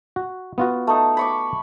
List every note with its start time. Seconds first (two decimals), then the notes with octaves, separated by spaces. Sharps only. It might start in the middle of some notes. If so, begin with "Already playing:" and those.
0.16 F#4
0.58 B3 F4 F#4
0.87 A3 D#4
1.17 B5 C#6 D6